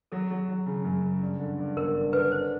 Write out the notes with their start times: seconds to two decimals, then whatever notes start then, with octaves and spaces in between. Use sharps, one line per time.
0.12 F#3 A4
0.31 F#3
0.49 F#3
0.66 C#3
0.85 F#2
1.03 C#3
1.22 G2
1.40 D3
1.58 G2
1.76 G1 A#4
1.95 D3
2.13 D3 B4
2.31 D4 C5